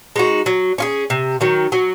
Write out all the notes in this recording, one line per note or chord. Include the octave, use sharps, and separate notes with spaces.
G#3 D#4 F#4
F#3
C#4 F4 G#4
C3
D#3 F#3
F#3